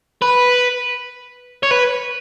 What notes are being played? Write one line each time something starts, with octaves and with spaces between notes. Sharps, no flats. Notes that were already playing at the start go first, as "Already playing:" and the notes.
B4
C#5
B4